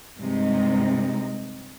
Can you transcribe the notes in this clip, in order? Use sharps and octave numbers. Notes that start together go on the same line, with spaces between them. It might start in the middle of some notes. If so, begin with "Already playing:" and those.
G2 C3 G#3 D#4